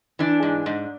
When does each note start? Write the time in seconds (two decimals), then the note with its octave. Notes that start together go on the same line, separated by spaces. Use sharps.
0.19 E3 D4
0.43 G#2
0.66 G#2